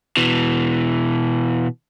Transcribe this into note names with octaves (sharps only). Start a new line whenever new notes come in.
B2 E3